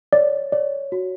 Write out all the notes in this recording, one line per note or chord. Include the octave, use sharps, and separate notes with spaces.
C#5 D5
C#5 D5
F#4